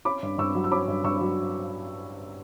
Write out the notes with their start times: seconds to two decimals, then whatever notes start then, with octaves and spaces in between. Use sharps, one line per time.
0.05 C#4 B5 D6
0.23 G2
0.38 G2 C#6 E6
0.55 F#3
0.64 E6
0.71 C#4 B5 D6
0.88 G2
1.04 G2 C#6 E6
1.21 F#3